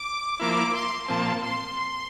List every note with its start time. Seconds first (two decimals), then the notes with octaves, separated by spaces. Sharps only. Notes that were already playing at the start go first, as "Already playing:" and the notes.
Already playing: D6
0.40 F3 A#3 E4 D6
0.74 C6
1.08 A#2 F3 C4 A5
1.43 C6